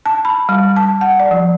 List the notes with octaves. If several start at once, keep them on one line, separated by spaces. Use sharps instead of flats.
A5
B5
G3
A5
F#5
D5
F3